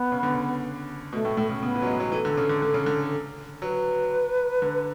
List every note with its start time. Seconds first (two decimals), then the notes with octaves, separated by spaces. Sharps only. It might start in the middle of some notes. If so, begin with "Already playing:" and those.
Already playing: B3
0.12 C#3
0.23 D3
0.33 C#3
1.12 B2 A3
1.25 A2
1.37 A2
1.49 C#3
1.62 C#3 B3
1.75 E3
1.82 F#3
1.87 G#3
2.00 F#3
2.12 E3 A4
2.25 D3
2.37 C#3
2.49 D3
2.62 D3
2.74 C#3
2.86 D3
3.62 F#3 B4
4.62 D3